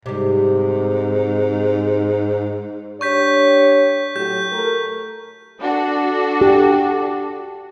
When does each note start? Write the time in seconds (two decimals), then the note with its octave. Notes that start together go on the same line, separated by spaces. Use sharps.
0.06 G#2 C3 G3
3.01 D4 G4 C#5 C#6 G6 B6
4.16 A2 F#3 G4 G6
4.52 A3 A4 A#4
5.61 D4 F#4 A4
6.41 G4